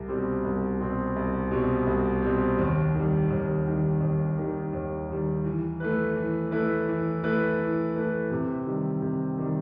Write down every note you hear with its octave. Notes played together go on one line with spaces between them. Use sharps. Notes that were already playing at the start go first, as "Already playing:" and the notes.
Already playing: C2
B2 G3 C4
C2
B2 G3 C4
C2
B2 G3 C4
C2
B2 G3 C4
D#2
D#3 G3
D#2
D#3 G3
D#2
D#3 G3
D#2
D#3 G3
E3
A3 E4 B4
E3
A3 E4 B4
E3
A3 E4 B4
E3
A3 E4 B4
C3
D#3 G3
C3
D#3 G3